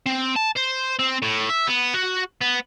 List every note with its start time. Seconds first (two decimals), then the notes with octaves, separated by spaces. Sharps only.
0.06 C4
0.36 A5
0.57 C5
0.99 C4
1.22 A2
1.50 E5
1.67 B3
1.94 F#4
2.41 B3